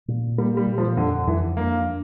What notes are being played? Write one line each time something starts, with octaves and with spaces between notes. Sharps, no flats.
A#2
G3 A#3
G3
A#2
F3
F2 D3
F2 E3
A#3 D4